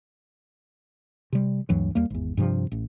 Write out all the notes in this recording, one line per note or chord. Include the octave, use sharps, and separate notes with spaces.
C3 G3
D2 G2 E3 F#3
D#2 G3 A#3
G#1 E2
G2 C3 F3
A1